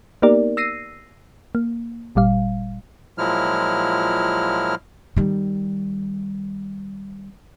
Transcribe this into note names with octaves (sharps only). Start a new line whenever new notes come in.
A#3 B3 D#4 G4 A#4 D5
E6 A#6 C7 D#7
A#3
G1 A#2 G3 F5
A#2 F3 F#3 G#3 E4 F6
D#3 G3